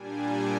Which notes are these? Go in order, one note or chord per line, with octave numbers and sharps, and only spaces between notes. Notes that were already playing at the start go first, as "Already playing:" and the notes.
Already playing: A#2 G3 D4 G#5